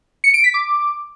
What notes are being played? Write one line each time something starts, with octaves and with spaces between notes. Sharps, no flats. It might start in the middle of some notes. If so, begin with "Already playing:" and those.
C#7
D7
B6
D6